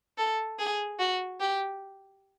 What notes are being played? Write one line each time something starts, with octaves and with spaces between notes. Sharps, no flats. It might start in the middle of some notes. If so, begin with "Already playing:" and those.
A4
G#4
F#4
G4